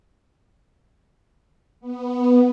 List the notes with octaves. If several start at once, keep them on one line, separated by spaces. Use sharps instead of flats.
B3